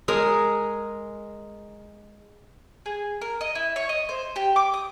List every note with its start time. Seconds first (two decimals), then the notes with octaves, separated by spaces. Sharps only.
0.08 G#3 G#4 A#4
2.86 G#4
3.21 A#4
3.41 D#5
3.55 E4
3.76 C#5
3.89 D#5
4.09 C5
4.36 G4
4.56 D6
4.74 D#6